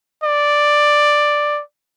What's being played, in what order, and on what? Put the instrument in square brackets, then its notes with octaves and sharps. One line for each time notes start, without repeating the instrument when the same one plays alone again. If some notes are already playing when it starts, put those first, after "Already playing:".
[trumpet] D5